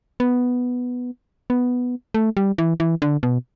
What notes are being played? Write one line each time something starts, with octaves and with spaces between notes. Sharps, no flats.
B3
B3
A3
G3
E3
E3
D3
B2